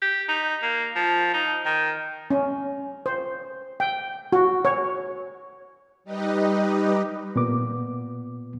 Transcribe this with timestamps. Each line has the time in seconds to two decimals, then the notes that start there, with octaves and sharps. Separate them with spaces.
0.02 G4
0.28 D#4
0.62 A#3
0.96 F3
1.33 D#4
1.66 D#3
2.31 C#4
3.06 C5
3.80 G5
4.33 F#4
4.65 C#5
6.04 G3 D#4 G4 B4 D#5
7.36 A#2 B3 D6